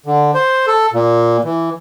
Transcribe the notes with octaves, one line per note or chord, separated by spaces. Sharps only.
D3
C5
A4
A#2
E3